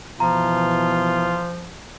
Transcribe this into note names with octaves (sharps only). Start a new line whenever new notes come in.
B2 E3 F3 F4 A#5